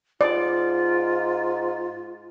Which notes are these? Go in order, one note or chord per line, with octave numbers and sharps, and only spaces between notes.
G#2 F4 D5